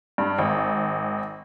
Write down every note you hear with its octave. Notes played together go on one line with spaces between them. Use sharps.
G2
G#1